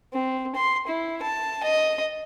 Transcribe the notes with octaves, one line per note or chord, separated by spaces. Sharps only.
C4
C6
E4
A5
D#5